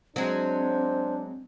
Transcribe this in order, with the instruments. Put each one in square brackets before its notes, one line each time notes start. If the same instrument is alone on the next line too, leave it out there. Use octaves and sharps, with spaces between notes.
[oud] F#3 G#3 [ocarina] C4 [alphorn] D4 [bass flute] C5